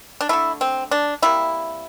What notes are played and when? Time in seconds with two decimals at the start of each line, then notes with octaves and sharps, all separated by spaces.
0.21 D4
0.29 D3 A3 E4
0.61 C4
0.91 D4
1.22 C3 G3 A#3 E4